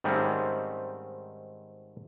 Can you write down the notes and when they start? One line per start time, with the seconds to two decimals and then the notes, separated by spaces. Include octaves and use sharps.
0.04 G#2 D#3 G3 A3 C4 C#4